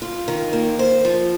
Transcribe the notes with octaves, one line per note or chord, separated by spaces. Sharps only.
F4
D#3
A#3
C5
F3